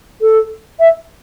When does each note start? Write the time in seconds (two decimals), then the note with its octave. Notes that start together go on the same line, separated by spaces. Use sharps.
0.21 A4
0.79 E5